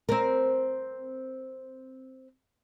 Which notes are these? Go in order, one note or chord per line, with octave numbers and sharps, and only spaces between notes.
C4 A#4